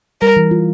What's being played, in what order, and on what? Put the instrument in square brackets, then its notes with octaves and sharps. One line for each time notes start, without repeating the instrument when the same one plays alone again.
[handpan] G3 [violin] A#4
[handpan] E3
F4